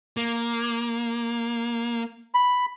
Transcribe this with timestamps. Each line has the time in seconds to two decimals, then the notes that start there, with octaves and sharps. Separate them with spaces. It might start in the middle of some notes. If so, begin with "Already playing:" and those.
0.17 A#3
2.34 B5